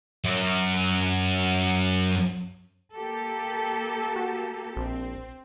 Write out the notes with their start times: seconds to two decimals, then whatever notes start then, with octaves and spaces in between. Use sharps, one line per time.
0.24 F#2 F#3
2.95 A#3 G4 A4
4.16 F#4
4.77 A#1 C4